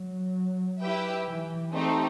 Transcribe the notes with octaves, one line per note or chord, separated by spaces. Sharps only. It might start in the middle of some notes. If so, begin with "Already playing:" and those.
Already playing: F#3
E4 G4 B4 E5 G5
E3
A3 C4 D#4 G4